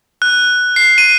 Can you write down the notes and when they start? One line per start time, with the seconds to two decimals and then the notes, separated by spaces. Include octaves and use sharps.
0.22 F#6
0.76 C7
0.98 D#7